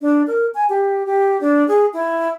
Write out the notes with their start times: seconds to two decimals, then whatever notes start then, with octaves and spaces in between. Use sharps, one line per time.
0.01 D4
0.27 A#4
0.54 G#5
0.69 G4
1.06 G4
1.41 D4
1.68 G#4
1.93 E4